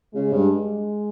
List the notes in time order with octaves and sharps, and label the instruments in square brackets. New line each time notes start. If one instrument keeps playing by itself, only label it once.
[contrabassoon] C#3 [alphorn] G#3
[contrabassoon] G2